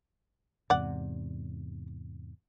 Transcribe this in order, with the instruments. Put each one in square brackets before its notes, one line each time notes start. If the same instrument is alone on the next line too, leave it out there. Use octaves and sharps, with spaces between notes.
[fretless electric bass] E2 G#2 C3 [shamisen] D5 F#5